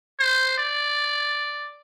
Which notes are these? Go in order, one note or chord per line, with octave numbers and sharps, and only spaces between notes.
C5
D5